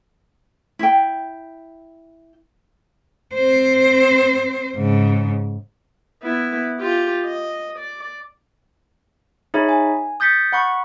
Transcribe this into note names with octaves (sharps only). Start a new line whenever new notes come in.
E4 G5
C4 C5
G#2 C#3
B3 E4
F4 G4
D#5
D5
D#4 G#4 C#5 E5 B5
G#5
D#6 G6 A6 B6 C#7
F#5 B5 C#6